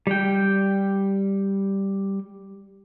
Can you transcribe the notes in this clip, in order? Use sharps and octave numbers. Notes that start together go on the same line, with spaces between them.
G3 G5